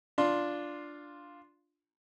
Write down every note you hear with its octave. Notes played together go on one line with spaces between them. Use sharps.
D4 F4 C6